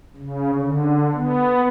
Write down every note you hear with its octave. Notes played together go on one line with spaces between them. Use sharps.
C#3
D3
B3